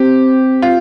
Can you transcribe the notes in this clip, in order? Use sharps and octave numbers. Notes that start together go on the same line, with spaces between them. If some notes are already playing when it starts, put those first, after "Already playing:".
Already playing: C4 G4
F4